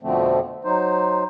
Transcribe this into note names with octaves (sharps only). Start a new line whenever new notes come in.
F2 B2 D3 F3 A3 C4
F#3 D#4 C5